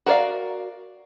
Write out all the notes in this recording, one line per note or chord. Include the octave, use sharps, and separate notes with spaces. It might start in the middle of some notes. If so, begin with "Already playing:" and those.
F#4 A#4 C5 D5 F5